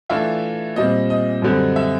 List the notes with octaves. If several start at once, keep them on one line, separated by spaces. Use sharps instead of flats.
E3 A3 D4 F4 E5
A#2 G3 C4 D#5
D#5
F#2 D3 G3 C4
E5